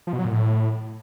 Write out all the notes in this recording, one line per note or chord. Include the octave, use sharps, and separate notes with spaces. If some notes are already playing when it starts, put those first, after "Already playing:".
F3
B2
F#3
A#2
A2